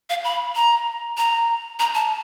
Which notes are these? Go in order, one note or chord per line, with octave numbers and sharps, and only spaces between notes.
F5
B5
A#5
A#5
A#5
A5